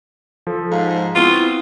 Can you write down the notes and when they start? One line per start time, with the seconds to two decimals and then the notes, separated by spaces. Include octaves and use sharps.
0.47 F3 A4
0.71 G#2 F5
1.15 B3 C4 E4 F4 F5